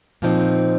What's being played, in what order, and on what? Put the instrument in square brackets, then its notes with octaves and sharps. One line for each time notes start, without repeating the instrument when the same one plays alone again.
[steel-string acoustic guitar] A#2 F3 C4 D#4